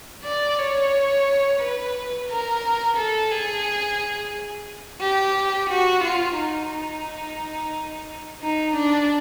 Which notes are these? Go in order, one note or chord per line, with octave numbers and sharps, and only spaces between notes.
D5
C#5
B4
A#4
A4
G#4
G4
F#4
F4
D#4
D#4
D4